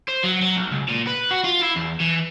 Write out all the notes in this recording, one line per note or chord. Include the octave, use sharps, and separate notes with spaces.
C5
F#3
F#3
B1
C#2
A#2
B4
F#4
F4
E4
E2
E3